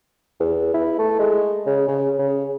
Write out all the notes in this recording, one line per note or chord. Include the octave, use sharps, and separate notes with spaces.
E2
E4
A3
G#3
C#3
C#3
C#3